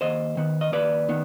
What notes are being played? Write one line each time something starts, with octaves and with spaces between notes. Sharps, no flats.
D#2 C5 D#5
D#3 B3
D#5
D#2 B4 D5
D#3 B3